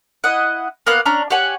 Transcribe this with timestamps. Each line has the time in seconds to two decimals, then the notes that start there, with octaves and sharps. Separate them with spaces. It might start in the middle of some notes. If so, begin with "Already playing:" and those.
0.24 E4 D#5 F#5
0.87 A#3 B3 F5 F#6
1.05 C#4 D4 A#5 F6
1.30 G4 C#5 F#5 G#5